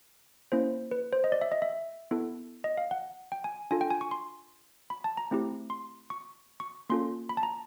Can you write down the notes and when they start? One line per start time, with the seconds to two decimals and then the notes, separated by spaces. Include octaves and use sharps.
0.52 A#3 C#4 E4 C5
0.91 B4
1.13 C5
1.24 D#5
1.32 D5
1.41 E5
1.52 D#5
1.62 E5
2.11 B3 E4 A4
2.64 D#5
2.77 F5
2.91 F#5
3.32 G5
3.44 G#5
3.71 D4 F4 A4 G#5
3.81 G5
3.91 G#5
4.01 C#6
4.11 C6
4.90 B5
5.04 A5
5.17 A#5
5.31 A3 C4 E4 G4
5.70 C6
6.10 C#6
6.60 C#6
6.90 A#3 C#4 F4 A4 C6
7.29 B5
7.37 A5
7.43 A#5